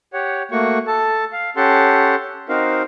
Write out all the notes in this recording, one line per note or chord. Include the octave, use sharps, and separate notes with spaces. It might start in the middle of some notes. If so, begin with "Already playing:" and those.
G4 C#5 F#5
A3 A#3 F#4 C#6
A4 A5
F5
C#4 G4 A4 F#5 A5 C6
C4 D#4 F#4 A#4 C5 F5